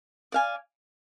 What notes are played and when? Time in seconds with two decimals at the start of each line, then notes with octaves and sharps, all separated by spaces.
0.32 D5 F5 G#5